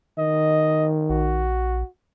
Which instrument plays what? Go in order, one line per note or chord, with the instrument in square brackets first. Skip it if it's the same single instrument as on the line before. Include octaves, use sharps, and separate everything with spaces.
[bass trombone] D#3 [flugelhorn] D#5
[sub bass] A#1 [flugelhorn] F#4